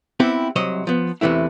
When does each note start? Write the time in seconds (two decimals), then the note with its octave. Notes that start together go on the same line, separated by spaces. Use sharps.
0.20 B3 C4 E4 G4 C5
0.56 C2 C3 F#3 C5 D#5
0.87 F3 B3
1.21 E2 C3 E3 A3 E4